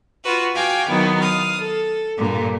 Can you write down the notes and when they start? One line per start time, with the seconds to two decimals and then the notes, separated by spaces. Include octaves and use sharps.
0.23 F4 F#4 B4
0.55 F#4 F5 G5 G#5 D6
0.88 D#3 F#3 B3 E4
1.20 F5 D#6
1.60 A4
2.17 G2 A#2 D3